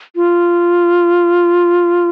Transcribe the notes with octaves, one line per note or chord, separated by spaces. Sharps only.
F4